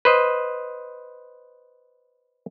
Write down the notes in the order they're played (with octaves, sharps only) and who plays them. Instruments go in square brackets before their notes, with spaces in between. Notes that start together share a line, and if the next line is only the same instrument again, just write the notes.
[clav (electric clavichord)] B4 C5 D#5